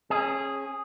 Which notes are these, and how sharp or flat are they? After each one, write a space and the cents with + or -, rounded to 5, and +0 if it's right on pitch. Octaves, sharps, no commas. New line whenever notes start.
C#4 -30 G#4 +0